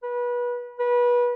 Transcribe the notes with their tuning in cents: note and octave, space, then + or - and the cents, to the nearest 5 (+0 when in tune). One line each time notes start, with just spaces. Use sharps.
B4 -25
B4 -25